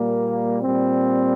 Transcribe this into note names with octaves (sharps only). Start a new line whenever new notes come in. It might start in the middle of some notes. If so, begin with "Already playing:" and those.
Already playing: A#2 G3 A#3
A#2 G3 C4